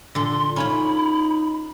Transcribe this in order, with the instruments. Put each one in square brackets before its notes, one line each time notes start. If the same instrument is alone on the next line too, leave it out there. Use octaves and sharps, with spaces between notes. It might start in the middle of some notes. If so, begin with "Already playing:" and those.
[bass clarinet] A#2 [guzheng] D3 A4 [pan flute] C6
[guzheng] C#4 F4 C#5 [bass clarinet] D#4 [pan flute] B5